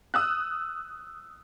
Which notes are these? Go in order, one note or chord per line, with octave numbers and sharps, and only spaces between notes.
D#6 E6 F#6